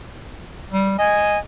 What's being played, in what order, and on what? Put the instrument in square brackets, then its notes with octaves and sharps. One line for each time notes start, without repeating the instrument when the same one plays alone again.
[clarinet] G3
[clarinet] D#5 [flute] G#5